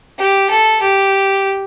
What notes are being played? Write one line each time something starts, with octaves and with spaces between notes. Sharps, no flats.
G4
A4
G4